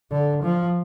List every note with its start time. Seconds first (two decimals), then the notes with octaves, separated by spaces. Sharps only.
0.11 D3
0.43 F3